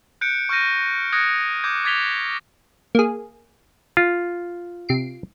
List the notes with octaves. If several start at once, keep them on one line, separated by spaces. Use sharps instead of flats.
F#6 G6 C#7 D7
C#6 F6 G6 A#6 D#7
D#6 F#6 G#6 A#6 C#7 D7
D6 G6 G#6
D6 G#6 A6 B6 F7 G7
A#3 G#4
F4
C3 C7 D7